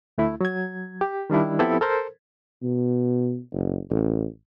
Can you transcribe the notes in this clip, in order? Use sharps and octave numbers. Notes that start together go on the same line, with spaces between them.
D2 A3 E4
F#3 G#6
G4
D#3 G3 D4 E4
F3 B3 C4 E4 G4 A4
A4 A#4 C5
B2
F#1
A1